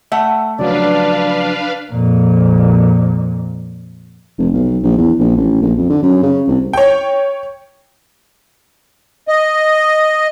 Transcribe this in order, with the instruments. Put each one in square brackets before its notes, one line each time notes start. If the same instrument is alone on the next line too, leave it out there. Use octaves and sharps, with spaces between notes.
[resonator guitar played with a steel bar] A3 F#5 [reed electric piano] E5
[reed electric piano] C#3 F3 F#3 [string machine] D4 B4 F5 [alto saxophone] D5
[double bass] F2 A#2
[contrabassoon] F1
B1
A#1
E2
A#1
A1
A#1
F2
D3
F#2
C#3
C2
[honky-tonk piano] C#5 G5
[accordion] D#5